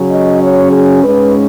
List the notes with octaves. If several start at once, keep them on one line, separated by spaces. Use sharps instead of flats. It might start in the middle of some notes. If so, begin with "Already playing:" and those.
Already playing: C#3 F#3 C#4
D#5
C#5
G#4
G#2 G#3 C#4 B4